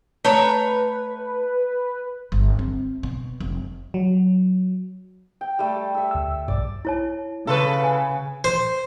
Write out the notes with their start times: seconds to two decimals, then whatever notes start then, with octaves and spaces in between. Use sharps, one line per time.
0.24 A3 B4 C#5 A#5
2.32 G1
2.59 C4
3.03 B2
3.40 F1
3.94 F#3
5.41 G5
5.59 G3 A3
5.95 A4 E5
6.11 D2 E6
6.48 B1 G2 D5
6.85 E4 C#5 A5
7.47 C#3 A4 B4 F5 C6 C#6
7.80 F#5 G#5
8.44 C5